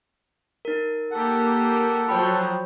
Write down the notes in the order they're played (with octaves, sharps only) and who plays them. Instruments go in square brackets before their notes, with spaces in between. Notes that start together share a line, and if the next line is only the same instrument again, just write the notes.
[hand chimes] D#4 A#4
[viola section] A#3 G4 [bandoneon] A4 F#5
[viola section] F3 F#3 [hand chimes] C#5 G5 B5